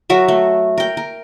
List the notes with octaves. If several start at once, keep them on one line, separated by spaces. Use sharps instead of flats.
F#3 F#4 A#4 E5
A3
A#4 G5
A#4